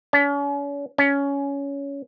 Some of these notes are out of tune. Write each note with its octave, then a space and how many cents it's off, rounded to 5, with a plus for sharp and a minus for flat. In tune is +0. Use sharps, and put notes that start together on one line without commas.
C#4 +40
C#4 +15